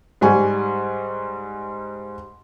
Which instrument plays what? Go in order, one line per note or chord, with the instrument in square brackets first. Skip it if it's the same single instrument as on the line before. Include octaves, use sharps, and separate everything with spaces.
[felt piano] G#2 G3 G#5 C#6